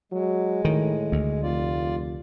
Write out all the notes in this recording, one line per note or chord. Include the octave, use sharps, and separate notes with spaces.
F#3 G#3
A2 D#3
D2
F1 F4 D5